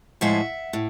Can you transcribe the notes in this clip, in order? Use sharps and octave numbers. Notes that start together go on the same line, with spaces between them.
A2 F3 G#3 E5 F#5
A2